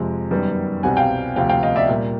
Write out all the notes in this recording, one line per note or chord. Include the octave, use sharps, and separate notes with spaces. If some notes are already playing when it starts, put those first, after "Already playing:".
Already playing: F2 C3 F3 G#3
F#2 D#3 G3 B3
C2 B2 G3 C4 F#5 G#5
F5 G5
D2 C3 F3 F5 G5
F5 G5
D#5 F5
D5 E5
A#2 G3 A#3